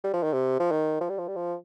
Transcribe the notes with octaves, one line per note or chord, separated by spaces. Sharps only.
G3
F3
D#3
C3
F3
D#3
F3
G3
F3
G3
F3